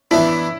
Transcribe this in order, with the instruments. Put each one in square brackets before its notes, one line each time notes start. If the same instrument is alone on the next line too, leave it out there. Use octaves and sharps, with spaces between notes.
[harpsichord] E3 B3 D4 [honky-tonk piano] E4